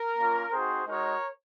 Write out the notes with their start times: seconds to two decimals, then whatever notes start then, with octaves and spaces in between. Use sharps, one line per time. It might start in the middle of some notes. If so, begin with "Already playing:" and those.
Already playing: A#4
0.17 A#3 C#4 F4
0.52 C4 D#4 F#4 G#4 C5
0.88 G#3 D#4 F#4 A#4 C#5